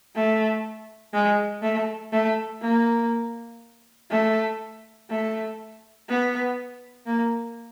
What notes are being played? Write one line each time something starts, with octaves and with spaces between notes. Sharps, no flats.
A3
G#3
A3
A3
A#3
A3
A3
B3
A#3